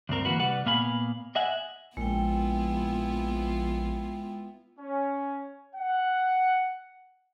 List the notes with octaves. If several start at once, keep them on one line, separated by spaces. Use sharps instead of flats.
D2 G2 C4 A#4
E3 A#3 F#4 B4
C2 G3 B4 F#5
A#2 A#3 B3 F5 G#5 B5
D#5 E5 F#5 G#5
A#1 G#3 B3 E4 F4 G5
C#4
F#5